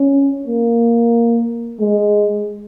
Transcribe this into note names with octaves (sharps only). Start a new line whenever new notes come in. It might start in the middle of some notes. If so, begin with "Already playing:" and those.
Already playing: C#4
A#3
G#3